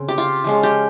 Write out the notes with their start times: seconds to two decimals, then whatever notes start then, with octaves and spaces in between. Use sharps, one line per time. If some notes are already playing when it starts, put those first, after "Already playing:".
Already playing: C#3 C4
0.08 G4
0.18 F4
0.44 F3 G#3 C#4
0.63 G4